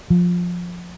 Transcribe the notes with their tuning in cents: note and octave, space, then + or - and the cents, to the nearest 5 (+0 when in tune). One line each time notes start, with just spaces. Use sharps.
F3 +15